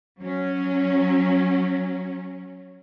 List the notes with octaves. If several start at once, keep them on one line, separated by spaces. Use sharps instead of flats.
F#3 C#4